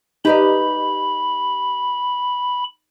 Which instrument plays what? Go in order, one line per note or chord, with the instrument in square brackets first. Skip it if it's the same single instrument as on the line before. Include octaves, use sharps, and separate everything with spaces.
[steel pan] D#4 [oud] G4 B4 D5 [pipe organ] B5